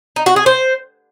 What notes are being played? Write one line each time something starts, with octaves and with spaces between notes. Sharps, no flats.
D#4
F#4
G#4
C5